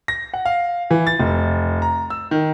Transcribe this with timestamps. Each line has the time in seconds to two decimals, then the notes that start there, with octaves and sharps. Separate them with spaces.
0.08 A#6
0.34 F#5
0.45 F5
0.91 E3
1.07 A6
1.19 F1
1.82 A#5
2.10 E6
2.31 D#3